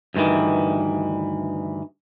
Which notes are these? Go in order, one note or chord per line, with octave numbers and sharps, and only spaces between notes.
D2 G2 B2 D#3 E3